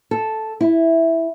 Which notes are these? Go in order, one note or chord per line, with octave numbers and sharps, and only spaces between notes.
A4
E4